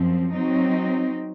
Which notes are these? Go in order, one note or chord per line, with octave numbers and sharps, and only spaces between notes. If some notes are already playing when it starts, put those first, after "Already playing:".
Already playing: F#2 F3 C4
F#3 C4 D#4